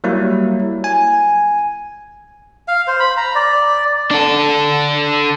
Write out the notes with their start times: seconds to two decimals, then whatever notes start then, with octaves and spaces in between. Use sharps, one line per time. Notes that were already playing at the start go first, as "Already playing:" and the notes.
0.04 F#3 G3 A#3 E4
0.84 G#5
2.68 F5
2.87 C5
3.00 B5
3.17 A#5
3.35 D5
4.11 D4 A4